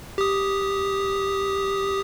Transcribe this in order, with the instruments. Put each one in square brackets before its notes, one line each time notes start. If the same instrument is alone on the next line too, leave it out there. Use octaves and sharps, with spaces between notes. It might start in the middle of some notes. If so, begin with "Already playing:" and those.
[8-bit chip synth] G4 D#6